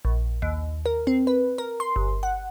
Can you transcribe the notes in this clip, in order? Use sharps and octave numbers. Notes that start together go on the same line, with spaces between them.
A#1
D#2
A#4
C4
B4
A#4
C6
G1
F#5